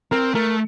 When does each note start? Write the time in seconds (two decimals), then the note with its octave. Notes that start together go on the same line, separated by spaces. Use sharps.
0.11 C4 A#4
0.35 A3 A#4